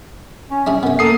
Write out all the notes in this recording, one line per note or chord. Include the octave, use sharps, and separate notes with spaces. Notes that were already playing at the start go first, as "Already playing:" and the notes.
C#4
C#4 D4 E4 G#4
F#2 B3 C#4
A#3 A4 D#6 C7